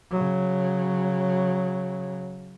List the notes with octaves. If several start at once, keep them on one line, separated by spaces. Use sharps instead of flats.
C#3 F#3